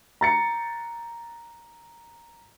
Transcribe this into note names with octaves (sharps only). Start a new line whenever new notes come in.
A#5 A6 C#7